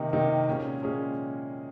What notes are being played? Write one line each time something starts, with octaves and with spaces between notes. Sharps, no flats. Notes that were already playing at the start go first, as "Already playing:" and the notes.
Already playing: C3 D#3 A#3 D#4
C3 D#3 A#3 D#4
A#2 G#3 C#4 G#4
A#2 G#3 C#4 G#4